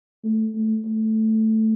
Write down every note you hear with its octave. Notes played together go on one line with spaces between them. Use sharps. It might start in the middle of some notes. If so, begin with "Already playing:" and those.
A3
A3
A3